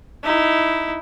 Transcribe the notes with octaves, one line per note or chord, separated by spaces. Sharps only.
D#4 E4